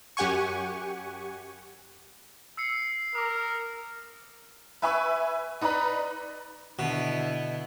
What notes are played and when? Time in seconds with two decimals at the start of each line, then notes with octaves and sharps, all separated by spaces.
0.17 F#2 G4 F#5 G#5 C#6
2.57 E6 C7 C#7
3.15 A#4 D6 D#6
4.82 B4 E5 G#5 B5 C#6
5.61 D#4 B4 D5 A#5 B5
6.79 B2 D3 B3 E4